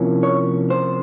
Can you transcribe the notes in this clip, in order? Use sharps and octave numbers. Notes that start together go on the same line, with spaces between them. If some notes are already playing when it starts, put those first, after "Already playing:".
Already playing: C3 F3 A#3 C#4 E4
C#5
C5